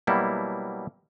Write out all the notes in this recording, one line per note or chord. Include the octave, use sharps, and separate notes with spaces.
B2 F#3 G3 A#3 E4